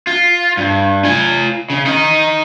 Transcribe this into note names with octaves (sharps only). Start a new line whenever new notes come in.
F4
G2
F4 G#5
C#3
D#4 A#4